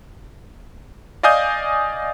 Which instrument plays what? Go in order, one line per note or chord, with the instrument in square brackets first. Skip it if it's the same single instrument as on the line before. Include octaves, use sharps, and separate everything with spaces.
[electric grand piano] D5 D#5 F5 G#5 D#6 G6